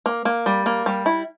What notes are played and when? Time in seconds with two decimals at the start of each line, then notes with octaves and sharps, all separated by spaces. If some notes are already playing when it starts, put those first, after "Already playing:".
0.06 A#3
0.25 A#3
0.46 G3
0.66 A#3
0.86 G3
1.06 E4